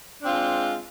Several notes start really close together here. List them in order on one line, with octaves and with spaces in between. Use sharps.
D4 C4 F4 G#3